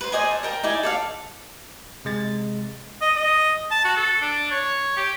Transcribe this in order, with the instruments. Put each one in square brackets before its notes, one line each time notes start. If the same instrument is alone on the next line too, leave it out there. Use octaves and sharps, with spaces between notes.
[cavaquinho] B4 C5
C5 D5 D#5 G#5
A4
A#4 G5 A#5
D#4 E4 D5 G#5
A4 D5 F5
[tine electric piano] C3 G#3 A6
[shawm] D#5
D#5
A5
F#4
A4
D4
C#5
G4